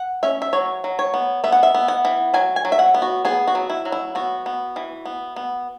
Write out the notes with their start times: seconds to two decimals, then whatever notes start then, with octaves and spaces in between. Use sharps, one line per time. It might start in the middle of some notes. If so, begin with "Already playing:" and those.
Already playing: F#5
0.23 C#4 E5
0.42 E5
0.53 F#3 C#5
0.84 F#3
0.99 C#5
1.14 B3
1.44 B3 E5
1.52 F#5
1.63 E5
1.74 B3
1.88 F#5
2.05 E3
2.34 F#3 G#5
2.56 G#5
2.65 F#3
2.72 E5
2.79 F#5
2.94 B3
3.02 F#4
3.25 B3 G#4
3.47 F#4
3.55 F#3
3.70 E4
3.85 F#3
3.92 E4
4.15 B3 F#4
4.46 B3
4.76 E3
5.05 B3
5.36 B3